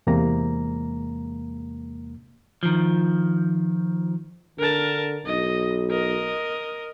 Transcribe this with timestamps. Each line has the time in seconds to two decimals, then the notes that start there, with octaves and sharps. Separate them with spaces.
0.07 E2 C3 G#3 A#3 A#5
2.63 D#3 F3
4.59 D3 A#4 A5
5.26 B1 D#5
5.91 A#4 D#5